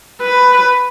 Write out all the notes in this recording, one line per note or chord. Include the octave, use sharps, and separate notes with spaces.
B4